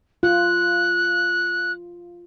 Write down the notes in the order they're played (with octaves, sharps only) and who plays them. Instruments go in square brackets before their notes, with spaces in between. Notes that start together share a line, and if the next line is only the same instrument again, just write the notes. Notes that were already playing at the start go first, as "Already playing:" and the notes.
[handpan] F4 [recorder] F#6